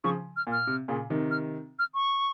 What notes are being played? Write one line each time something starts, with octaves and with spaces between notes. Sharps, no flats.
C#3 F3 C#6
F6
A#2
F6
C3
A#2 C#3
C3 D#3
F6
F6
C#6